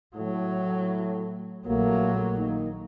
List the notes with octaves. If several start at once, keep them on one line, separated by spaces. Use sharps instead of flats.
A2 F#3
A#1 F#3 A3 A#3
D#3 A#3 D#4